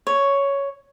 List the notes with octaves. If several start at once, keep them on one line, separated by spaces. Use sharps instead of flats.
C#5